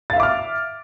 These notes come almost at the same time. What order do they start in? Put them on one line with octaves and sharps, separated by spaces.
A6 F5 E5 D6 F6